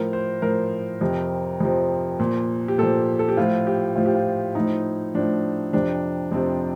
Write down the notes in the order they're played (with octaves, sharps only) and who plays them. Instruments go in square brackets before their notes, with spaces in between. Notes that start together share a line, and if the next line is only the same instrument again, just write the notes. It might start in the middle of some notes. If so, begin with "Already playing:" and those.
Already playing: [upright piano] A2 F3 A#4
C5
A2 F3 A#4
F2 C3 F3
F2 C3 F3
A#2 F3
G4
A#2 F3 A4
A4
G4
A2 F3 F4
G4
A2 F3 F4
G4
F4
A2 F3 D#4
A2 F3 D4
F2 C3 F3 D4
F2 C3 F3 C4